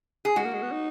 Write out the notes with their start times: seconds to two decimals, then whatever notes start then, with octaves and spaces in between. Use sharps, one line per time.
0.25 G#4
0.36 G#3 F#4
0.45 A#3
0.54 G#3
0.62 B3
0.72 D#4